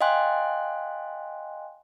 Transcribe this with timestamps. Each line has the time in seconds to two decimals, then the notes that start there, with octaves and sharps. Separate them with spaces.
0.01 D#5 F5 G5 G#5 C6 F#6